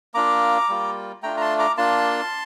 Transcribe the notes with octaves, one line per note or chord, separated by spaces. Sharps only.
A#3 D4 F4 A#5 D6
G3 A#3 F4
A3 D4 F4 G5 A#5
A#5
A5 C6
A#5 D6
A#3 D4 F4 A5 C6